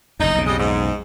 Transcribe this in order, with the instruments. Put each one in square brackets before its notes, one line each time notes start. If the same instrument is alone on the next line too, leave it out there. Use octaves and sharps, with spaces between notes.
[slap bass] F#1 E2 [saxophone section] D#4
[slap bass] B1 F2 C#3
[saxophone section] G3 G#3 D#5
G#2